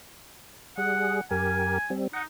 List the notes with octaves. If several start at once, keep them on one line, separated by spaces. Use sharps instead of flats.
G3 G#4 F#5
F#2 G4 A#4 G#5
G3 C4
D#4 F#5